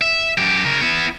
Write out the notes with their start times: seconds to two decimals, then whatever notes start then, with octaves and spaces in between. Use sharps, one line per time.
0.01 E5
0.38 F#2 G4
0.66 C#3 A#4
0.81 B3 E4